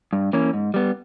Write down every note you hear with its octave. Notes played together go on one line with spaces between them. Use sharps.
G2
E3 A#3 C#4
G#2
G3 B3